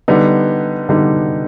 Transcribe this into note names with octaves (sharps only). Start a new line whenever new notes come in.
D3 G3 B3 D#4
D3 G3 B3 D#4